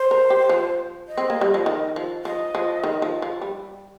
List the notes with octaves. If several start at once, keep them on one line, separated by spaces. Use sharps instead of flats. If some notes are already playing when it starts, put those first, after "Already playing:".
Already playing: C5
A#4
G4
F3
D#5
C4
A#3
G3
F3
D#3
F3
F3 D#5
F3
D#3
F3
F3
G3